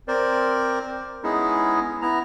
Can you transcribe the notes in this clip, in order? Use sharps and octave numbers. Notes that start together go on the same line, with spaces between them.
C4 A#4 C5 D5
G#3 B3 C#4 D#4 E4 G#4
B3 E4 A#5